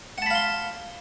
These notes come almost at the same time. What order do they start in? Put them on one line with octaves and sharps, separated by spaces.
F#5 A5 B5 F5 C6